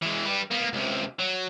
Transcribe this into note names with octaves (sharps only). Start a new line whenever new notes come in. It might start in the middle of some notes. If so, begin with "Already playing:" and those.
E3 G#3
G3 B4
A#3 B3
C#2 C3
F#3